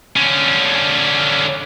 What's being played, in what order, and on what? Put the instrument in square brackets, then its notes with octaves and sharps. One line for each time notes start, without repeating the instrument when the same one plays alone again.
[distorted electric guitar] D3 C#4